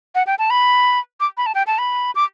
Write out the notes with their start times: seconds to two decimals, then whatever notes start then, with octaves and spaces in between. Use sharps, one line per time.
0.15 F#5
0.27 G5
0.39 A5
0.50 B5
1.20 D6
1.37 B5
1.46 A5
1.55 G5
1.67 A5
1.78 B5
2.15 D6